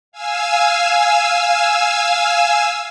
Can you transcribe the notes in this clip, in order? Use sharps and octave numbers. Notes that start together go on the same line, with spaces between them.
F5 G#5 E6